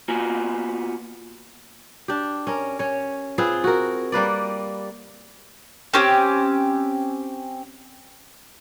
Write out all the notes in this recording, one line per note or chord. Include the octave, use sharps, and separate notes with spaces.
A#3 B3 F4 F#4 G#5
D4 G4
C#4 A#4
C#4 C#5
C4 F4 G#4 B4
F#4 A#4
G3 A#3 B4 D5
C4 C#4 G4